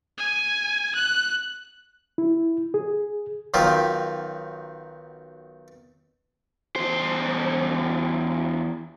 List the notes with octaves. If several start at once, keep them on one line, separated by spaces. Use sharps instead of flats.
G#5
F#6
E4
G#4
B1 D#3 F#3 F4 G4
E2 C5